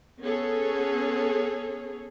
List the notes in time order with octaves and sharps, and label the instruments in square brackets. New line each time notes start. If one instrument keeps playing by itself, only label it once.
[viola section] B3 C#4 G#4 A4 C#5